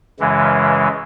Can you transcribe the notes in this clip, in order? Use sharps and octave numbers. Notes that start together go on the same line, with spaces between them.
F#2 C#3 E3 G#3